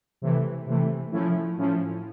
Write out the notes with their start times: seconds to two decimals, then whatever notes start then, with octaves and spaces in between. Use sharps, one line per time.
0.22 C3 E3 A3
0.67 C3 E3 A3
1.12 A2 F3 A3 C#4 E4
1.57 A2 F3 A3 C#4 E4